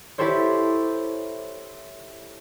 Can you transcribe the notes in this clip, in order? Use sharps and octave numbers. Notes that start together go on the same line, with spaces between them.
E4 G4 A4 C5 C#5